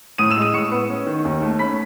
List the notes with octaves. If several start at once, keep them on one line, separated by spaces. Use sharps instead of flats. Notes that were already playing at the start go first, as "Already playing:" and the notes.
A2 D#6 D#7
E6 E7
G#3
D#6 D#7
A2 C#6 C#7
B3
C#4
D#3
D#2
A3
C#4 B5 B6